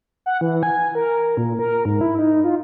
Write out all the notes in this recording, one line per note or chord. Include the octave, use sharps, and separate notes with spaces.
F#5
E3
G#5
A#4
A#2
A#4
G#2
E4
D#4
F4